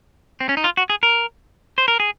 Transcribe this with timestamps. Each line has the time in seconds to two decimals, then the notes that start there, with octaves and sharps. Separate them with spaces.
0.40 C4
0.49 C#4
0.57 D#4
0.64 F4
0.77 F#4
0.90 G#4
1.03 A#4
1.78 C5
1.88 A#4
2.00 G#4